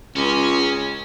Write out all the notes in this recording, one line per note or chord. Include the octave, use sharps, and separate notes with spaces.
C#2 C#4